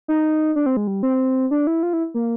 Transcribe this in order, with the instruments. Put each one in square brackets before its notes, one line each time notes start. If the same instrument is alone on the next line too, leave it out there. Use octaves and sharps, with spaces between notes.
[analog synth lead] D#4
D4
C4
G#3
G3
C4
D4
E4
F4
E4
A#3